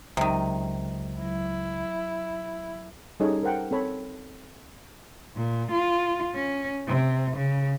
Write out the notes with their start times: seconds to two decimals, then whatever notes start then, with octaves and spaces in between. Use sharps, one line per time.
0.17 C#2 C3 D#3 F#3
1.21 F#3 E4
3.20 G3 C#4 D#4 G#4 A4 C#5
3.43 A#4 C5 F#5 G5
3.71 C4 A4 C#5 B5
5.36 A#2
5.71 F4
6.35 C#4
6.87 C3
7.36 C#3